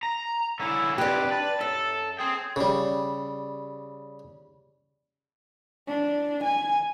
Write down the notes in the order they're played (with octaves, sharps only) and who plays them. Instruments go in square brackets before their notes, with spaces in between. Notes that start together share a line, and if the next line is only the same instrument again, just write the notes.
[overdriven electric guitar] A#5
[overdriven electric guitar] D3 C#4 [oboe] E4
[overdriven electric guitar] F2 C3 [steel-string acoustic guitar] D4 G4 [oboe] B4
[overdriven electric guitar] B4 [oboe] A5
[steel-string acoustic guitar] F#2 [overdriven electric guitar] A4
[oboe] G#4 [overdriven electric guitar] C5 G5
[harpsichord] C#3 G3
[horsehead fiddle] D4
G#5